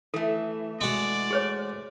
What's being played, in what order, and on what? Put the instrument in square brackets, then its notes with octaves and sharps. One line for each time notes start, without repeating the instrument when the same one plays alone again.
[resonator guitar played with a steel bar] E3 A3 [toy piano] A4
[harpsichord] G#3 F#4 [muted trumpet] D5
[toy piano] G#4 C5 C#5